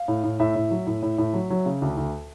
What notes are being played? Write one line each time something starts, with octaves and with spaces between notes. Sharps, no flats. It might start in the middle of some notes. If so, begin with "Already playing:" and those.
Already playing: F5
A2
A2
A2 E5
A2
F#3
A2
A2
A2
F#3
F#3
C#3
D2
D2